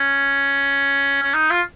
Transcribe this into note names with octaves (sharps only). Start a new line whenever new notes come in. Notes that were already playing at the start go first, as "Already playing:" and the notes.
Already playing: C#4
C#4
D#4
F4